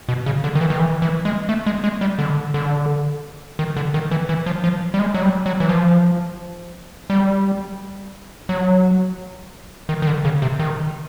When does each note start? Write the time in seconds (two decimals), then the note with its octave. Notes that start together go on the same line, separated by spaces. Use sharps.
0.09 B2
0.26 C#3
0.44 D3
0.55 D#3
0.61 E3
0.70 D#3
0.79 E3
1.02 E3
1.25 G#3
1.49 A3
1.66 G#3
1.84 G#3
2.01 G3
2.19 D3
2.54 D3
3.59 D#3
3.77 D3
3.94 D#3
4.11 E3
4.29 E3
4.46 F3
4.64 F3
4.94 G3
4.99 G#3
5.14 F#3
5.22 G3
5.46 F#3
5.60 E3
5.69 F3
7.10 G3
8.49 F#3
9.89 D#3
10.02 D#3
10.07 D3
10.25 C#3
10.42 C3
10.59 D#3